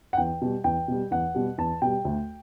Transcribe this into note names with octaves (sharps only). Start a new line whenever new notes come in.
F#5
E2 G5
B2 G3
E2 G5
B2 G3
E2 F#5
B2 G3
E2 A5
B2 G3 G5
D2